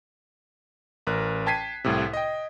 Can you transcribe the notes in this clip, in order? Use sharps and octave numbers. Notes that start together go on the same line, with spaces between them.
A1 A#4 F#6
G5 A5 G#6 B6 C7 D#7
C2 A2 C3
D#5 G5